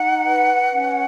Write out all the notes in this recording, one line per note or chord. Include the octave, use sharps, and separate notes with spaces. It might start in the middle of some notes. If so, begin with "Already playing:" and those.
Already playing: D#4 F#5
B4
C#4